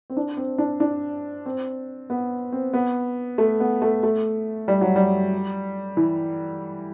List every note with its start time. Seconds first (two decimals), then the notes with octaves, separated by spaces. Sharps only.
0.10 C4
0.17 D4
0.37 C4
0.58 D4
0.80 D4
1.46 C4
2.10 B3
2.52 C4
2.73 B3
3.38 A3
3.60 B3
3.82 A3
4.03 A3
4.68 G3
4.81 F#3
4.96 G3
5.97 E3